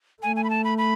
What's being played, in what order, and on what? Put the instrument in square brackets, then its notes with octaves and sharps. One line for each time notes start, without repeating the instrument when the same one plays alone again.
[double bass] A3 [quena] G#5
[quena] G#5
B5
A5
B5
B5